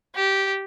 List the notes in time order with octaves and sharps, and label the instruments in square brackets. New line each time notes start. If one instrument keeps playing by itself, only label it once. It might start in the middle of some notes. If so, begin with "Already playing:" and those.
[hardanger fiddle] G4